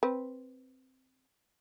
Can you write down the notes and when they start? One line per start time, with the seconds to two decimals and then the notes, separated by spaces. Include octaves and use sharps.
0.03 C4 B4